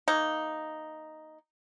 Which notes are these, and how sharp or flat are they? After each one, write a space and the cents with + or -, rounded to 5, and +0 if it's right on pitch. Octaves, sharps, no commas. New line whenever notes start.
A#3 +0 D#4 +0